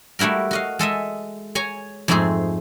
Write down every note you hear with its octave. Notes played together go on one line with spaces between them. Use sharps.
G3 A3 E4 F#4 A#4
F#4 D#5 F5
G#3 A4 D#5 E5
C#5 G#5 A#5
F2 G#2 A3 C4 G#4